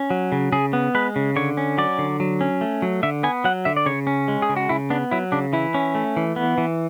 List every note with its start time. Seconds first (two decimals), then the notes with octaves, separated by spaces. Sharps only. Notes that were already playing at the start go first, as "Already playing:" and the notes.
Already playing: C#4
0.10 F#3
0.32 C#3
0.52 C#3 G#4
0.73 B3
0.95 G#3 B4
1.16 C#3
1.36 D3 C#5
1.57 C#4
1.78 F#3 D5
1.99 D3
2.20 F#3
2.41 C#4
2.61 A3
2.82 F#3
3.03 D3 E5
3.23 B3 G#5
3.44 F#3 F#5
3.65 D3 E5
3.77 D5
3.86 C#3 C#5
4.07 C#4
4.28 G#3
4.42 G#4
4.49 C#3
4.57 F#4
4.69 C#3 E4
4.90 B3 D4
5.11 F#3 E4
5.32 C#3 D4
5.53 E3 E4
5.74 C#4
5.95 A3
6.17 E3
6.36 B3
6.58 E3